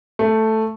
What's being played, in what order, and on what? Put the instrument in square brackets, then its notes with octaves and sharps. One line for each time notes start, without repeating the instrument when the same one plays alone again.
[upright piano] A3